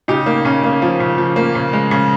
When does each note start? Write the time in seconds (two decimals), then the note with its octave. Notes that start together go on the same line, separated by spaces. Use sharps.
0.08 C#3 D#4 G4
0.26 A#3
0.45 C#3 C#4
0.64 A#3
0.82 F3
1.00 C#3
1.18 F3
1.36 A#3
1.55 C#3
1.73 G#3
1.91 C#3